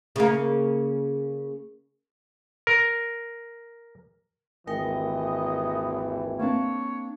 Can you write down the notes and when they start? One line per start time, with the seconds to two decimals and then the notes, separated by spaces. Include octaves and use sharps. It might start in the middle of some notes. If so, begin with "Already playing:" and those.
0.16 C#3 A#3
2.67 A#4
4.67 G#1 D#2 E3 G#3 A#4 D#5 G5
6.39 A#3 C4 D4 C#5